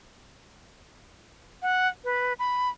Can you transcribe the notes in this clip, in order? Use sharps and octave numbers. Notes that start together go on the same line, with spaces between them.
F#5
B4
B5